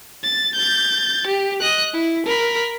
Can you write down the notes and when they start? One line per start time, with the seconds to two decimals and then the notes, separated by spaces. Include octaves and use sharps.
0.23 A6
0.55 G6 A6
1.27 G4
1.60 D#5 F#6
1.93 E4
2.26 A#4 B5